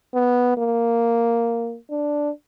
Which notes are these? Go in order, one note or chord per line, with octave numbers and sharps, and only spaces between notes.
B3
A#3
D4